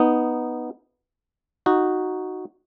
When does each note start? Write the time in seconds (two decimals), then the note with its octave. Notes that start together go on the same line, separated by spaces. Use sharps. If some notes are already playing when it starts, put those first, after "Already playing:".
Already playing: B3 D#4
1.66 D#4 F#4